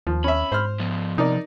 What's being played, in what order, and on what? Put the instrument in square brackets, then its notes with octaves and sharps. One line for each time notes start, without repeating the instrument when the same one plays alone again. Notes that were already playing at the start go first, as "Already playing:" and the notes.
[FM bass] D#2 [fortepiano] F3
[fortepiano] C#4 E5 [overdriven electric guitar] B5
[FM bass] G#2 [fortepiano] C5 F6
[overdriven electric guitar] F3 B3
[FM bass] C3 [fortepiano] D#4 A#4 D5